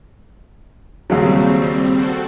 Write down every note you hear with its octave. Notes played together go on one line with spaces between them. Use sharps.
D#2 C#3 F#3 G3 C4
C4 F#4 A4